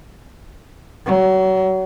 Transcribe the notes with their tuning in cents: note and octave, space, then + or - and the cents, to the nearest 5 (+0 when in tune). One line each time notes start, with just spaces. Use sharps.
F#3 +30